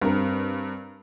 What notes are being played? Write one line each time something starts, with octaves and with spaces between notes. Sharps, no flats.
G2 C4 A#4